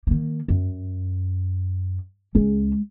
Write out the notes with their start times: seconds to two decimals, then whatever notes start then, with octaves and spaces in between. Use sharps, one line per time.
0.07 D#3 A#3
0.48 F#2
2.35 C#2 G#3 C#4